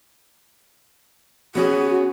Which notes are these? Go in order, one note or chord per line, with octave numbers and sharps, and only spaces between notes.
B3 C#4 F#4 G#4